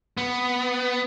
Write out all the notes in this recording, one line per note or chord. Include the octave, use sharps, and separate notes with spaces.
B3